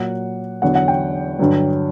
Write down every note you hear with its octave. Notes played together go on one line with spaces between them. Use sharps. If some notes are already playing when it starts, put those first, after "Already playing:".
Already playing: A#2 F#3 F#5
E2 D3 F#3 F#5
F#5
G5
G2 D3 F#3